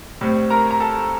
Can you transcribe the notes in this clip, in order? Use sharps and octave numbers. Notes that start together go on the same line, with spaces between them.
A2 G3 C4
A#4 A#5
A#5
A4 A5